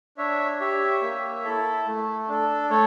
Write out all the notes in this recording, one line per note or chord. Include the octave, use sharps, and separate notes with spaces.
D4 C#5 E5
G4 C#5 E5
A#3
E4 A4
A3
D4 A4
A3 A4 C#5